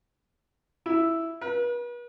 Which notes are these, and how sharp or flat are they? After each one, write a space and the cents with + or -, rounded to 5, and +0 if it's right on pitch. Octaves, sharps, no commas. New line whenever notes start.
E4 +0
B4 -40